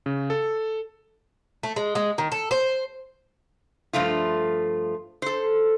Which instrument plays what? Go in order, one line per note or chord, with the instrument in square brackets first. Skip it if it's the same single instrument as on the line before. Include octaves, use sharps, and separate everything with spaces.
[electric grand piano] C#3
A4
[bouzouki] A3
G#3
G#3
D#3
A4
C5
[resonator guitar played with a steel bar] G2 F3 A3 F4
A4 C5